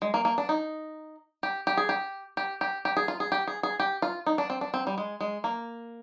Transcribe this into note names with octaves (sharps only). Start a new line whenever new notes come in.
G#3
A#3
A#3
D4
D#4
G4
G4
G#4
G4
G4
G4
G4
G#4
F4
G#4
G4
G#4
G#4
G4
F4
D#4
D4
C4
D4
C4
G3
G#3
G#3
A#3